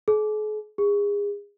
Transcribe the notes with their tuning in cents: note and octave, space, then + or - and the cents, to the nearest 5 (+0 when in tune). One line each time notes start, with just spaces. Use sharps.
G#4 +45
G#4 -30